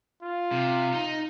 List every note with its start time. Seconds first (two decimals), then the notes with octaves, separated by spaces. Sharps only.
0.22 F4
0.52 C3
0.93 D#4